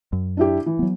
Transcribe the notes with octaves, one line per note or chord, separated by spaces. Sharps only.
F#2
D4 E4 G4
E3
F#3 B3